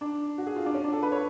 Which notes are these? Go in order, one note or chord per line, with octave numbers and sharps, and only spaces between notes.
D4
F#4
G#4
F4
D4
C#4
D4
A4
B4
C#5